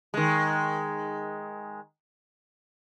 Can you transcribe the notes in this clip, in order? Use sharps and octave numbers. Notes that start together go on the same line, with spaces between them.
D#3 G#3